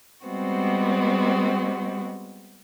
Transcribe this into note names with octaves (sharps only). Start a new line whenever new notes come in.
G3 G#3 B3 C4 F#4